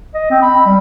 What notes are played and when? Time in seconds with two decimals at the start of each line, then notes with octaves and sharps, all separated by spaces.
0.14 D#5
0.30 C4
0.42 B5
0.66 G3